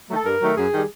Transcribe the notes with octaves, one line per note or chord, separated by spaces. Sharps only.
D#3 F#3 A3
A4
G2 A#4
D#3 F#3 A3
F#2 G#4
D#3 G3